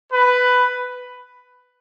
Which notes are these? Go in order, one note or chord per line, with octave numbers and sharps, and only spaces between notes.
B4